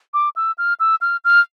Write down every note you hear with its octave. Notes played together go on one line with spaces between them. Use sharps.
D6
E6
F6
E6
F6
F6